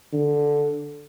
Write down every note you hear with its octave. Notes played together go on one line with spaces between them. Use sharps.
D3